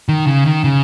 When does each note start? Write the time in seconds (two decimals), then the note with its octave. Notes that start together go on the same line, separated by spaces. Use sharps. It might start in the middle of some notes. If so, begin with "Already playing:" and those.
0.09 D#3
0.27 C#3
0.45 D#3
0.64 C#3